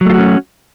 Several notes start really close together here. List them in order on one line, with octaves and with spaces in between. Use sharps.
F#3 A3 F4 F#4 C#4